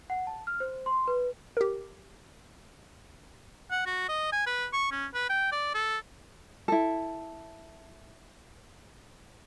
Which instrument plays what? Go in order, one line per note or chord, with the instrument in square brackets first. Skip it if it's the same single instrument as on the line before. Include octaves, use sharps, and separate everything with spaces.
[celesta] F#5
A5
F6
C5
C6
B4
[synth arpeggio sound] G4 A#4
[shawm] F#5
F#4
D#5
G#5
B4
C#6
C#4
B4
G5
D5
A4
[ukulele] E4 A4